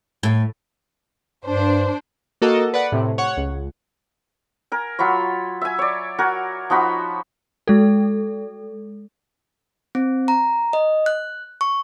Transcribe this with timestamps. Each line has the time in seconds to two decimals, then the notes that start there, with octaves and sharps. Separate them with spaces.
0.23 A2
1.45 G2 D4 C5
2.42 A#3 F#4 A4 A#4 D#5
2.74 B4 D5 F#5
2.92 A2 C3
3.18 C#5 F#5
3.37 C#2
4.72 A#4 G#5
4.99 F#3 F4 B5 C#6
5.61 E5 G#5
5.79 C#5 D5
6.19 F#4 A#4 G#5
6.70 F3 D#4 F#4 B5
7.68 G#3 A4
9.95 C4
10.28 A#5
10.73 D#5
11.06 F#6
11.61 C#6